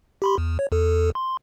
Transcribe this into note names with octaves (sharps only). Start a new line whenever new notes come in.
G4 B5 C6
E2
C#5
E2 A4
C6